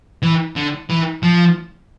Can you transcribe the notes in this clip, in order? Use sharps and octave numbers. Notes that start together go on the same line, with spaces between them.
E3
D3
E3
F3